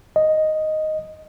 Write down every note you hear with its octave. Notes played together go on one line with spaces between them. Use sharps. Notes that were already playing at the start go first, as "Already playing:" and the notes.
D#5